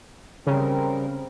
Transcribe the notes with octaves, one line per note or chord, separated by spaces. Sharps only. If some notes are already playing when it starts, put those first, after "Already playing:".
C#3 G3 C4 A#4